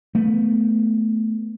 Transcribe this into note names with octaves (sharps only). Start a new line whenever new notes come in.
A3 B3